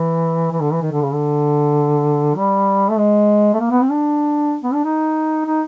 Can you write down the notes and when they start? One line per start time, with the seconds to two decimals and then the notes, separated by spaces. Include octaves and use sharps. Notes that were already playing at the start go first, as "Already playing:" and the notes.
Already playing: E3
0.52 E3
0.61 D3
0.72 E3
0.82 D#3
0.92 D3
1.02 C#3
1.12 D3
2.36 G3
2.90 A3
2.98 G#3
3.54 A3
3.60 A#3
3.71 B3
3.81 C4
3.90 D4
4.63 B3
4.73 D4
4.84 D#4
5.46 D#4